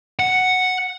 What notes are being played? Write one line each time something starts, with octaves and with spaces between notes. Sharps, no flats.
F#5